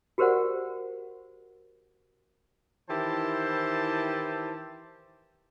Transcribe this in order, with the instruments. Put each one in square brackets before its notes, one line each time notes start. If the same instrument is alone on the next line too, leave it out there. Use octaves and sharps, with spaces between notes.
[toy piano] F#4 G4 A#4 C5 D5 F#5
[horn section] D#3 E3 E4 G4 C5 A5